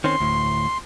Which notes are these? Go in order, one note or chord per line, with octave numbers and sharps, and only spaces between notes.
D#3 C4 C#4 C6
D2 A2